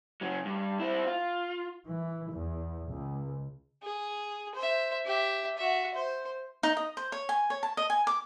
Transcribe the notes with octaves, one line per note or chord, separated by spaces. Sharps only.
C#3 F#3
G2
C4 E4
F4
E3
E2
C#2
G#4
C5 E5
G4 E5
F#4 E5
C5
D#4
D#5
C5
C#5
G#5
C#5
A5
D#5
G#5
D6